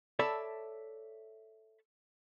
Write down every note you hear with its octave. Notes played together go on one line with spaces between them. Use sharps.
A4 C#5 D5 E5 A5 B5